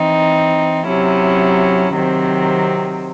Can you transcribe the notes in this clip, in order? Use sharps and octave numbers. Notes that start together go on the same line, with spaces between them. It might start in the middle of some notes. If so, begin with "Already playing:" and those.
Already playing: E3 C4 D#4
C3 F#3 C#4 E4
C3 D#3 F#3 C4